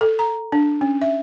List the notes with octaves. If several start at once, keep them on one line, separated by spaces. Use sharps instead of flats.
A4
A#5
D4
C#4
E5